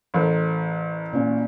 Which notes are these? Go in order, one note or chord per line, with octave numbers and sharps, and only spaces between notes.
A1 A4 A#4 C5
A#2 C#4